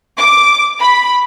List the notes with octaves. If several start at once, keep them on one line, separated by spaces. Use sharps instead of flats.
D6
B5